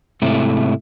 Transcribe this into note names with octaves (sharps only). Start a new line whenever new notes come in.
G#2 C3 A3 E4